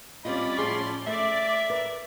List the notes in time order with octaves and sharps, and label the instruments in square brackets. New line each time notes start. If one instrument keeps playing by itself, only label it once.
[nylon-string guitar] G3 C4 F4 [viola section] C#4 D5 B5 [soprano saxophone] D#5
[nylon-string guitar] A2 F3 G#4 [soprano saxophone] C6
[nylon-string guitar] A3 [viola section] D5 [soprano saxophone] E5
[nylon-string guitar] A#4 B4